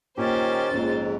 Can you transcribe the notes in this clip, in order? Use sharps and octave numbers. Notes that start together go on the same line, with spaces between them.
A#2 D#3 C#4 G4 C5 A6
A#1 F2 G#2 C#4